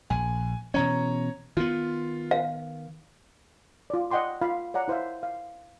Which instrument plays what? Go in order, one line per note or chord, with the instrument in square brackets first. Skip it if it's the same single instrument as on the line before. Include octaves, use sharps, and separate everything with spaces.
[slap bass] A#1 [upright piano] G#5
[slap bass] B2 E3 C#4 [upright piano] C#5 A#5
[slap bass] D#3 B3 [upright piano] F4
[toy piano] F5
[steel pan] F4 D5
D5 D#5 F#5 G5 C6 D6
F4 F5 B5
C#5 D5 F#5 A#5
E4 C5 E5 F5
F5